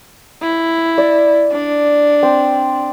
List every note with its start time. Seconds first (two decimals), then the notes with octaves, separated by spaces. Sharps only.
0.42 E4
0.98 D5
1.52 D4
2.23 C4